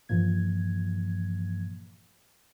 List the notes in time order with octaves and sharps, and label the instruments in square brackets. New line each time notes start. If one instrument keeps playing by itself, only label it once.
[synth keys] G2 A#2 E3 F3 A#3 G#6